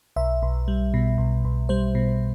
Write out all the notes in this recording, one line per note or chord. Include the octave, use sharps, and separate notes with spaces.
B1 E5
B1
G3
B2
B1
B1
G3 C5
B2